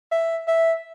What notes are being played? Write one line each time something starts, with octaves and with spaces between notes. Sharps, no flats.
E5
E5